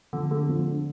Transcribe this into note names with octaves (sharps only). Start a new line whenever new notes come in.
D3 F3
D3 A3 D4
F3
A3 D4